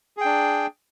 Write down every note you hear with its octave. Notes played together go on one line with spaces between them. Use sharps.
D4 G#4 G5